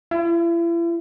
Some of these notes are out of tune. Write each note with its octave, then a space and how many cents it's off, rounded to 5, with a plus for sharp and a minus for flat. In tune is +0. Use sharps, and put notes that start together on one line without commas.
E4 +40